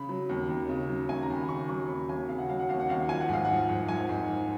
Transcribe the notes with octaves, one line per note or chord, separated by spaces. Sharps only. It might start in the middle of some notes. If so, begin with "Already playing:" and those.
Already playing: C#3 B5
F#3
D#2
D#2
C#3
F#3
D#2 G#5
A#5
D#2
B5
C#3 C#6
F#3 C#6
D#2 B5
D#2 G#5
C#3 F5
F#5
F#3 F5
F#5
D#2 F5
F#5
D#2 F5
F3 G#5
F#5
G#2 F5
F3 F#5
G#2
F3 G#5
G#2
F3